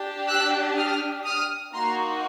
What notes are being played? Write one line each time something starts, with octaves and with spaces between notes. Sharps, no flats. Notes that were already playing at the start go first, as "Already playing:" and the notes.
Already playing: D4 G4
E6 F#6
D#6 F6
D#6 F6
A#3 D#4 F#4 A#5 C6